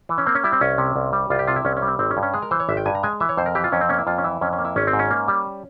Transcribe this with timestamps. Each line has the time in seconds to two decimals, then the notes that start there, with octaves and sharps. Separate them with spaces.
0.09 E3
0.18 C#4
0.26 A#3 C4
0.35 C#4
0.44 G3 E4
0.52 C4
0.61 C2 C#4
0.78 C3
0.96 C2
1.13 G3
1.30 C2 F4
1.39 G4
1.47 C3 F4
1.56 E4
1.65 C2 C#4
1.77 C#4
1.82 G3
1.88 C4
1.99 G#1 C4
2.11 C#4
2.17 G2
2.23 C#4
2.34 G#3 G#4
2.42 A#4
2.51 E3 C5
2.60 C#5
2.69 G#1 E5
2.77 G5
2.86 G2 G#5
2.95 A#5
3.03 G#3 G#5
3.20 E3 E5
3.29 C#5
3.37 F2 C5
3.46 A#4
3.55 E3 G4
3.64 F4
3.72 F2 C#4
3.81 C4
3.89 A#3 C#4
3.98 E4
4.07 F2 F4
4.18 C#4
4.24 E3 E4
4.41 F2 C#4
4.53 C#4
4.59 A#3
4.65 E4
4.76 G#1 C#4
4.87 C4
4.93 G#2
4.99 C#4
5.11 A#3
5.28 G3